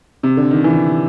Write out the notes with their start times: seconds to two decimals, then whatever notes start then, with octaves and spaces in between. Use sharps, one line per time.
0.23 C3
0.37 D3
0.51 D#3
0.64 E3